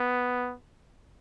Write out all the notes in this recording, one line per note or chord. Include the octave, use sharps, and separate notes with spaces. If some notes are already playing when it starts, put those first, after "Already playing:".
Already playing: B3